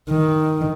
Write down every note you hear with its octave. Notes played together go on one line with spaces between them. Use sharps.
D#3